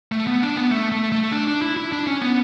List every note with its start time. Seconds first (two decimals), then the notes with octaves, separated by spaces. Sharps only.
0.12 A3
0.27 B3
0.42 D4
0.56 B3
0.72 A3
0.92 A3
1.12 A3
1.32 D4
1.47 D4
1.62 E4
1.77 E4
1.92 D4
2.07 C#4
2.22 B3